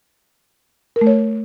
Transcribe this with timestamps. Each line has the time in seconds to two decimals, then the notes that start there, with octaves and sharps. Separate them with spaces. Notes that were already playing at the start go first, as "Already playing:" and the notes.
0.96 A#4
1.01 A3
1.07 C#5